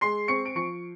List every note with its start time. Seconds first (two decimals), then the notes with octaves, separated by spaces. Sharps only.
0.01 G#3 C6 C7
0.28 C4 C#6 C#7
0.45 D7
0.55 F3 C#6 C#7